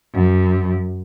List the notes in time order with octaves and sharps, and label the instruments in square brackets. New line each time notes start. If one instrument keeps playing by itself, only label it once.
[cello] F#2